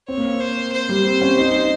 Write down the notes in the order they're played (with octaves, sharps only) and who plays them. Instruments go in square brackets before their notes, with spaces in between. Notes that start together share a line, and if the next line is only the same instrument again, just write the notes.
[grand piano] C4 [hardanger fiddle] C#5
[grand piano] A#3
C4
[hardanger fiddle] C5
C5
[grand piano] G3
C4
C#4
D#4